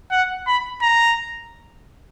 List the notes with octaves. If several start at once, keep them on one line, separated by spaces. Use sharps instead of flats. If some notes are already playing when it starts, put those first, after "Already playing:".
F#5
B5
A#5